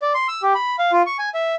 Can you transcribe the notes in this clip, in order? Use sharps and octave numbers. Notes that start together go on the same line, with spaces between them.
D5
C6
E6
G4
B5
F5
F4
C#6
G#5
E5